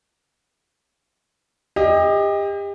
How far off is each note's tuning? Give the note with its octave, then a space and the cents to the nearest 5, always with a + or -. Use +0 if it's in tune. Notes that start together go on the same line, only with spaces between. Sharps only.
G4 +35 D#5 +15